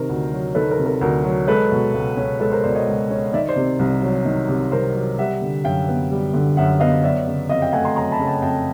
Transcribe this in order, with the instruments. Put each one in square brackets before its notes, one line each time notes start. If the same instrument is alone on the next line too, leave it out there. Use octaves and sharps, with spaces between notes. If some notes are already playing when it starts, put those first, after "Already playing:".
Already playing: [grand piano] C3 D#3 A#4 C5
D2
F#3
D#3 A4 B4
A#4
C3
A#4
D2 A#4
F#3
G#3 A4 B4
B2
C#2
C#4
G#3 A4 B4
A#4 C5
B2 C5 D5
C#5 D#5
C#2
C#4
D#3 D5 E5
C5 D5
C3
C2
F#3
D#3
C3
C2 A#4 C5
F#3
G3 E5 F#5
D3
F#2 F5 G5
B3
G3
D3
F#2 E5 F#5
B3 D#5 F5
F#3 D5 E5
C#3
F2 D#5 F5
F5 G5
A3 F#5 G#5
A#5 C6
F#3 A#5 C6
A5 B5
C#3
G5 A5
F2 G5 A5